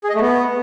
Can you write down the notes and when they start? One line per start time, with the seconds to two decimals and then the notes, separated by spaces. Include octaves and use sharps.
0.04 G#4
0.09 D#5
0.15 A3
0.20 B3